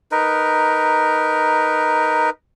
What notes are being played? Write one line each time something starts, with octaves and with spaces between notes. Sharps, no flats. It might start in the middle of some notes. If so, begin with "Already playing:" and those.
D#4 A#4 B4